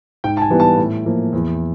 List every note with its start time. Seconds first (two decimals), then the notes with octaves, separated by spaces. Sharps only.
0.24 G#2 G5
0.37 A5
0.42 G#5
0.50 E3 G3 B3
0.60 A5
0.78 A2
1.05 F3 A#3
1.33 E2